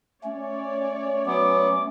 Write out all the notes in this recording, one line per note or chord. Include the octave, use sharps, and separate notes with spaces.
A3 C#4 C#5 D5
F#3 B3 D6